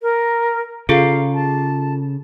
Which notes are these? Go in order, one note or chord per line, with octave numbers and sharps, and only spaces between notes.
A#4
C#3 F4 G#4 A4 F5
A5